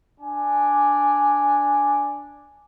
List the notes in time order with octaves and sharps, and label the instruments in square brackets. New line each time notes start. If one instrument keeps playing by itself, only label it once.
[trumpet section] D4 G#5